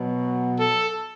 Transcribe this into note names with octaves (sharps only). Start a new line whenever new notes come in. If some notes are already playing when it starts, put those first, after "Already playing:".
Already playing: B2 F#3
A4